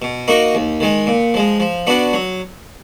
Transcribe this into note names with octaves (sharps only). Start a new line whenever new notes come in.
B2
A#3 D#4 F#4 A#4
D#2
D#3 G#3
A#2
F3 G#3
F3
B3 D4 F#4
F#3